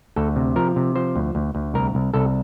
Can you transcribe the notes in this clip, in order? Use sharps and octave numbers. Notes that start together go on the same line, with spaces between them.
D2 A4
C3
F3 A#4
C3
F3 C5
D2
D2
D2
C2 A#4
C2
C2 A4